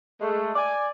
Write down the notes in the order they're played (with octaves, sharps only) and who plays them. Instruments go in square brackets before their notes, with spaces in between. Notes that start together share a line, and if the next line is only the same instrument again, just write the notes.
[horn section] G#3 A3
D5 G#5